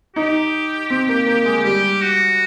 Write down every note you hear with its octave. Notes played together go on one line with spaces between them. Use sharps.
D#4 G4
C4
A#3
A#3
G#3
G3 G4
F#4